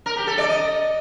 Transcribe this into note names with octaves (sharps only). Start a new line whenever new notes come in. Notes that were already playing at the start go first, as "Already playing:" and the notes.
A#4
G4
A4
D5
D#5